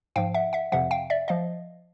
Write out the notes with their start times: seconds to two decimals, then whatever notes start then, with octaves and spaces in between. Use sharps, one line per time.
0.16 G#2 F3 F5 G5
0.34 E5 F#5
0.53 E5 F#5
0.72 F2 C3 F3 E5 F#5
0.91 F5 G5
1.10 D5 E5
1.28 F3 D#5 F5